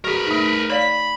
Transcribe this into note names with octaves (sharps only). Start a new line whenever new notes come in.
F#4 G#4 A#4 B4
A3 D#4
C#5 D5 F5 B5